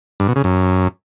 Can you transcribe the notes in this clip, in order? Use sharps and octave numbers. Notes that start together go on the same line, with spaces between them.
G2
B2
C#3
F#2